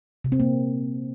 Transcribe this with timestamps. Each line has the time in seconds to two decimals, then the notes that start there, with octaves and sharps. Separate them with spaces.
0.24 C3
0.32 C4
0.40 A#3